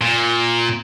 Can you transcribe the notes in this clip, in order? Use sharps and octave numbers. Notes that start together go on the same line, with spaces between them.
A#2